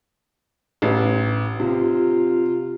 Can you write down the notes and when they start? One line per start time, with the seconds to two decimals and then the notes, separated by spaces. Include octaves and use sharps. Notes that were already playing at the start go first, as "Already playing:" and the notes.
0.82 A1
1.60 C3 F4